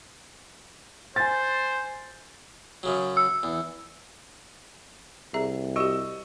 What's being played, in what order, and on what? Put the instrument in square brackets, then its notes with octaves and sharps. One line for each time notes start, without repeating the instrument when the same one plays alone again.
[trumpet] C5 [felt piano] G#5 A6
[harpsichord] F#2 C#3 F#3
[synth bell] E6
[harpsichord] E2
[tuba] C2 [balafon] G#4 E5 A#5
[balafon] F#4 G4 [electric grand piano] D#5 C#6 E6